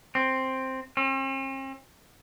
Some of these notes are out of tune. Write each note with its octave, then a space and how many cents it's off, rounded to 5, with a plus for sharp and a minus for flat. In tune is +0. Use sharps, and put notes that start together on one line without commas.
C4 +5
C4 +45